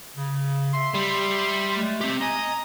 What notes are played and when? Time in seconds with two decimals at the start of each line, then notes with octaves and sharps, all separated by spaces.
0.16 C#3
0.73 E5 C6
0.95 G3
1.77 G#3 A3
2.01 C4 G4
2.21 D#5 G#5 A#5